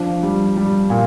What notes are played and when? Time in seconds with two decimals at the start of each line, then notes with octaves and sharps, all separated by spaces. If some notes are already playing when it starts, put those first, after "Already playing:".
Already playing: F3 D4
0.23 G3
0.57 G3
0.90 A#2